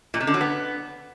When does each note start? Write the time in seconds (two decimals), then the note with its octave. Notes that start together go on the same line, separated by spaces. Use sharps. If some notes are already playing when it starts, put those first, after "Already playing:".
0.14 A#2
0.21 C3
0.27 D3
0.34 F#3
0.41 B3